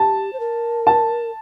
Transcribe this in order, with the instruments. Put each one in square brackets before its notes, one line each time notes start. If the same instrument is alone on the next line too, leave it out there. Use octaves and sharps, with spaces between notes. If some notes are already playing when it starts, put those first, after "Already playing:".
Already playing: [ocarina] G4 [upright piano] A5
[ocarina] C5
A#4
[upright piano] A5